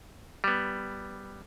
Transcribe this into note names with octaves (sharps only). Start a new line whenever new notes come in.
G3 B3